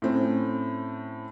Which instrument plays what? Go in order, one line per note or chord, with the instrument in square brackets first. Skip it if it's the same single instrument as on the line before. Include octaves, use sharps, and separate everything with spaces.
[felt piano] A2 C4 C#4